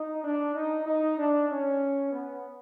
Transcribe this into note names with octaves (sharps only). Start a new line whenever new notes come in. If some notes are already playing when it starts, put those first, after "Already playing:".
Already playing: D#4
D4
D#4
D#4
D4
C#4
B3